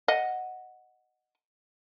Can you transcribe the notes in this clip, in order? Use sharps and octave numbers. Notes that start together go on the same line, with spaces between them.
D#5 F#5